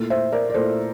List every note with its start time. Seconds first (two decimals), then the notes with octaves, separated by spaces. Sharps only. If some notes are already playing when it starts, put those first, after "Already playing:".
Already playing: A#2 A3 E4
0.10 C5 E5
0.32 A#4 D5
0.50 D5
0.54 A#2 A3 E4 A4 C5